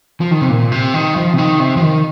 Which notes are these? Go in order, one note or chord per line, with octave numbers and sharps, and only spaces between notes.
F3
D#3
C3
A#2
C3
D#3
F3
C3
D#3
C3
F3
D#3